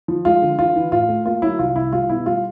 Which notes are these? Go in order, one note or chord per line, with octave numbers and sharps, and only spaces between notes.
F3
G#3 F4
D3
E3 F4
E3
A2 F4
A3
A#3 F4
F#3 E4
C2 F4
C2 E4
G3 F4
B2 E4
G3 F4